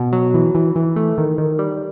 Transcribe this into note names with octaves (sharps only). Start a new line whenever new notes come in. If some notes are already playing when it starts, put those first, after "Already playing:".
Already playing: B2
F#3
E3
E3
E3
A3
D#3
D#3
G3